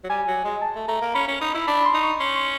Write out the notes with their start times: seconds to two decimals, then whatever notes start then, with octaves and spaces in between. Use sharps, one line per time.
0.04 F#3
0.09 G3 G#5
0.27 F#3
0.44 G#3
0.61 A5
0.75 A3
0.88 A3 A#5
1.01 A#3
1.14 C#4 B5
1.28 C#4
1.41 D#4
1.54 E4
1.67 D4 B5
1.85 C6
1.94 D#4
2.03 C#6
2.20 C#4 C6
2.28 C#6
2.36 C6